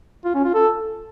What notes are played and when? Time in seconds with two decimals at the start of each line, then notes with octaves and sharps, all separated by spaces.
0.25 F4
0.34 C#4
0.44 F4
0.54 A4